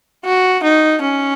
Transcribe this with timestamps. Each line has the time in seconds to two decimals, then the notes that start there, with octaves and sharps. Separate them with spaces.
0.25 F#4
0.64 D#4
1.02 C#4